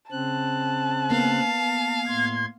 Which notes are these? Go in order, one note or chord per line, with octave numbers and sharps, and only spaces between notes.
C#3 C4 A5 F#6
A#3 B3 F5
A2 C6 G#6